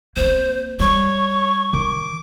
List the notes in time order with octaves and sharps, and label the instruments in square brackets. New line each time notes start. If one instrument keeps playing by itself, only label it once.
[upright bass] A#3 C4 [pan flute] C5
[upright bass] G3 [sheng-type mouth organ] C#5 [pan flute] C#6
[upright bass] D#3 [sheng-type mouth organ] D6